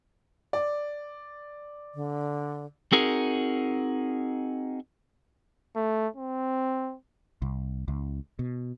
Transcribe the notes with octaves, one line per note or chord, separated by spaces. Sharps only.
D5
D3
C4 D#4 F#4 G#4 A#4
A3
C4
C2
C#2
B2